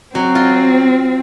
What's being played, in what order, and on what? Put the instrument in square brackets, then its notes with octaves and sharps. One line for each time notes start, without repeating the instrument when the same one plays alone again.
[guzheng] F#3 [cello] C4
[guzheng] F4